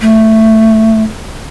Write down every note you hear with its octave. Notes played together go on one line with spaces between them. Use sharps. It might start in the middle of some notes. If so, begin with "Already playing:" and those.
A3